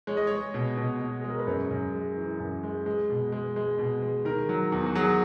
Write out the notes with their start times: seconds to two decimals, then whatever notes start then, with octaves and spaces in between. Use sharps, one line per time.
0.07 G#3 C#5
0.17 D#5
0.27 G#3 C#5
0.54 B2
0.77 B2
1.01 B2
1.21 G#3 G#4
1.30 A#4
1.39 B4
1.47 F#2 C#5
1.70 F#2
1.93 G#3
2.17 E3
2.40 F#2
2.63 G#3
2.86 G#3
3.10 B2
3.32 G#3
3.56 G#3
3.79 B2
4.02 G#3
4.25 D#3 A#4
4.49 F#3
4.72 E2
4.86 F#4
4.95 F#3 G#4